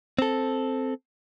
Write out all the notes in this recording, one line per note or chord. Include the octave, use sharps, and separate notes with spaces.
C4 A4